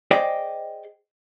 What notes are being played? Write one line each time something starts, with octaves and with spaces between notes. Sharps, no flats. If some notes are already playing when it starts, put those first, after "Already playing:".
G#4 C5 D5 D#5 G5